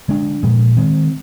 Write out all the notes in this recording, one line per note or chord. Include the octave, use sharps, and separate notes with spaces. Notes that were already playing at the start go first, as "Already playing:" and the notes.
D3 G#3 D4
A#2 F3 G#3
D#3 G#3 C4